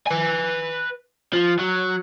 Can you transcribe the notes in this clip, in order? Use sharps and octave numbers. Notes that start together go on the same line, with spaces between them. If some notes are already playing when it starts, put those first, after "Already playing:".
B4 G#5
F3
F#3